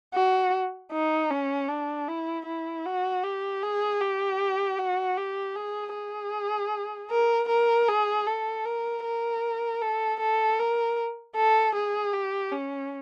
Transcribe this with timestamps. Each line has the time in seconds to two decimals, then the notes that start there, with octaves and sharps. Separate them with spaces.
0.14 F#4
0.92 D#4
1.30 C#4
1.69 D4
2.08 E4
2.46 E4
2.86 F#4
3.23 G4
3.62 G#4
4.01 G4
4.79 F#4
5.17 G4
5.55 G#4
5.94 G#4
7.10 A#4
7.49 A#4
7.88 G#4
8.26 A4
8.65 A#4
9.04 A#4
9.82 A4
10.20 A4
10.59 A#4
11.36 A4
11.75 G#4
12.14 G4
12.52 C#4